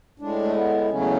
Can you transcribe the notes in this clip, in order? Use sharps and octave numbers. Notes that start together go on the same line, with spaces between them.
A2 G#3 D4
A3
B3
E2 C#3 F#3 A3 C#4